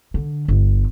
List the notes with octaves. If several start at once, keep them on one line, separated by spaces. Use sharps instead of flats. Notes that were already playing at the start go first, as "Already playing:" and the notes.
D3
G1